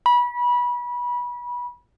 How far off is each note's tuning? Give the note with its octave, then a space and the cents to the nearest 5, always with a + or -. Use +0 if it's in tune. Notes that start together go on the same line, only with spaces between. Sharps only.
B5 -25